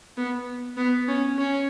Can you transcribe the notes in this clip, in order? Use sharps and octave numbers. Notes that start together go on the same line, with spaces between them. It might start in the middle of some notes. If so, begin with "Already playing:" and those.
B3
B3
C#4
C#4